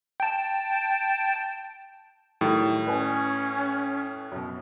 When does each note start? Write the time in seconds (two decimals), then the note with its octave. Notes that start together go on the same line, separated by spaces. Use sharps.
0.20 G5 A5
2.41 A2 D#3 F#3 G3
2.87 C#4 B4 G#5
4.32 F#2 B2